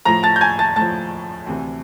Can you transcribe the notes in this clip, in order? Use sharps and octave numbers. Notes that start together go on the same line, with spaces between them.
A2 F3 A#5 A#6
A5 A6
G6
G#5 G#6
A5 A6
A2 F3 A5 A6
D2 C3 E3